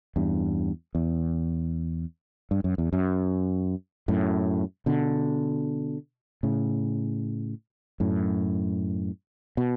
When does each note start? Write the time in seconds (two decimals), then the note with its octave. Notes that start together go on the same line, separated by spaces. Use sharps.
0.16 E2 G2
0.95 E2
2.51 G2
2.64 F#2
2.78 E2
2.93 F#2
4.08 F#2 A2
4.86 B2 D3
6.43 A2 C#3
8.00 F#2 A2
9.57 B2